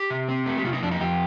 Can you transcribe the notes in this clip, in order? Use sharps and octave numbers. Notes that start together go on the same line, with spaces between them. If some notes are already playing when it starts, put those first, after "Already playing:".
Already playing: G4
C3
C4
A3
G4
C3 F4
D#4
F2 D4
D#4
F2 G4